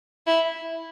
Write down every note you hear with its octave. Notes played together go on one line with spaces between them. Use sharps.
E4